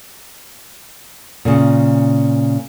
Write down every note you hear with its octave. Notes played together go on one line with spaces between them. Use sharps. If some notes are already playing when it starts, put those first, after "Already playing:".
A#2 C#3